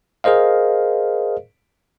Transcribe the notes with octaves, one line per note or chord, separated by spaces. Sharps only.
G#4 A#4 C5 D#5 F5